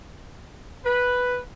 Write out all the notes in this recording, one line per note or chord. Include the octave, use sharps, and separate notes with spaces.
B4